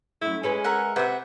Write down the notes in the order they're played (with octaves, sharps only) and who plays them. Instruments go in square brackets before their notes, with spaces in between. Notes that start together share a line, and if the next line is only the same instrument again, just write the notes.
[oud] F#2 A3 [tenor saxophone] E4
[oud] G#3 G#4 B4 [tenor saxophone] C#4
[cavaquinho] A#4 E5 F#5
[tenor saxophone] C3 [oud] B4 [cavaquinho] E5 F#5